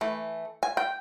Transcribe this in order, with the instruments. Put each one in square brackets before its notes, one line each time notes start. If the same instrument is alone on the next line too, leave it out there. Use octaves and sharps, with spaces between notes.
[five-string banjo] E3 A3
G#5
G5